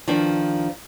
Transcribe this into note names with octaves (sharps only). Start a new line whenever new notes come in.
D#3 F3 D4